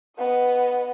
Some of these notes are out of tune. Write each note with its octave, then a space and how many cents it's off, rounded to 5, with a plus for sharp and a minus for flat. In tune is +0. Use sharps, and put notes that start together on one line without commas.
B3 +0 D#5 -5